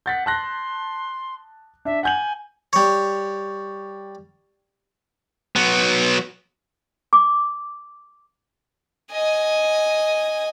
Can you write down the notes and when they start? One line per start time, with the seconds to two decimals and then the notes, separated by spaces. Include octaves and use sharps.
0.06 F#5 G6 A6 B6
0.26 A5 C6 F#6 A#6
1.85 D4 E5
2.03 F#5 G#5 G6 F#7
2.73 G3 C#5
5.56 F#3 B3
7.13 D6
9.12 D#5 G#5